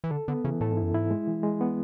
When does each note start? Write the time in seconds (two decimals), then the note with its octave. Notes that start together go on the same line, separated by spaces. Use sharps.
0.04 E3
0.11 D3 A4
0.28 D3 B3
0.44 C#3 E3
0.61 A2 A4
0.72 G#2
0.77 E4
0.83 F#2
0.93 G#2 E4
1.10 G#3
1.27 E3
1.43 G#3
1.61 B3